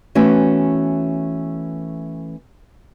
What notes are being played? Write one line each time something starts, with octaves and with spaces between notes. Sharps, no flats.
E3 A3 B3 C#4 F#4